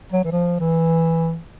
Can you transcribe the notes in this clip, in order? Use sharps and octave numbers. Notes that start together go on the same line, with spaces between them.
F#3
E3
F3
E3